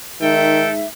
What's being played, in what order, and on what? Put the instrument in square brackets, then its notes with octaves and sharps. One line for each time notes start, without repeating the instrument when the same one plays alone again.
[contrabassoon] G#2 [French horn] D#3 [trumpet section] A4 G5 [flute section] E5